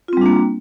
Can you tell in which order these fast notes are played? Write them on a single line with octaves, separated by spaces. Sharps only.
F4 C4 G3 D4 A#3